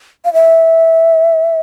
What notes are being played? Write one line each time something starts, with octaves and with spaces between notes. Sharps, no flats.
F5
E5